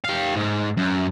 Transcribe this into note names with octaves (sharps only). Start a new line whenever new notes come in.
G4 F5
G#2
F#2